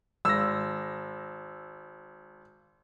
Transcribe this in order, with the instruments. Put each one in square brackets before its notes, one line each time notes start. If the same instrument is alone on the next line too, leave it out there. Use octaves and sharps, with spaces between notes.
[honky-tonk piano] G#1 [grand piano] E6 A#6